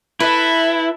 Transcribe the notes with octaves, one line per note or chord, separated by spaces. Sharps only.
E4 A4 B4 E5